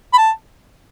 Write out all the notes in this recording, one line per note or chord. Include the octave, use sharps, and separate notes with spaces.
B5
A5